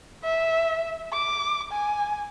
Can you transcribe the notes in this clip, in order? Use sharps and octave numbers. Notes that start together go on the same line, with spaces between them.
E5
D6
G#5